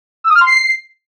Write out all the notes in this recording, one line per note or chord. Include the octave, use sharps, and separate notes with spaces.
E6
D#6
F6
C6
C7